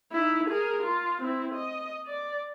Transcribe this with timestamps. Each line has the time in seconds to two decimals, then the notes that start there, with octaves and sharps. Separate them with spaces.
0.12 D#4 E4
0.50 G#4 A#4
0.83 F4
1.22 C4 E4
1.54 D#5
2.07 D5